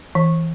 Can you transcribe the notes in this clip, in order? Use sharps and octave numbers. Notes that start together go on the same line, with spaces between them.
E3